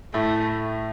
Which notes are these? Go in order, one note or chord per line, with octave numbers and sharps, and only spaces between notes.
A2 A3